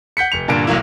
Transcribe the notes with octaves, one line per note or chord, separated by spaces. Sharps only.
F#5 G6 B6 C#7
F1 C#7 F7
G2 A#2 D3 A#3 D7
B1 F#3 A#3 E4